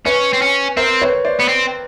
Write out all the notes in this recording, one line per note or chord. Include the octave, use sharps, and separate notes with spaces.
C#4 B4 C#5
C4
C#4
C4 A#4 C5
B4 C#5
C5 D5
B3
C4